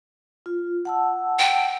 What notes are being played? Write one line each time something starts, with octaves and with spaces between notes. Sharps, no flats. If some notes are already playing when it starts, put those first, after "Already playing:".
F4
F#5 A5 E6
G5